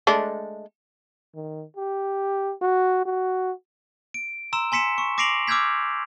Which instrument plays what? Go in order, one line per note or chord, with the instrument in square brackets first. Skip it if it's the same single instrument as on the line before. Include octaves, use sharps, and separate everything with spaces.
[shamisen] G#3 A3 D4
[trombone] D#3
G4
F#4
F#4
[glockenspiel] D7
A#5 C6 E6 E7
G#5 C6 B6 C#7 E7
C#6
D6 A#6 C7 D7 F7 F#7
D6 E6 F6 G6 G#6 B6